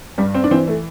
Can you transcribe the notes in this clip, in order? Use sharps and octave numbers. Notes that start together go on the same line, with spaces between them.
G2 G3
C4
D4
E3 C4
A3